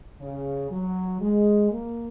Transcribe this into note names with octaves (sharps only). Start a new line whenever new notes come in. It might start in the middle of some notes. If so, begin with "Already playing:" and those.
C#3
F#3
G#3
A#3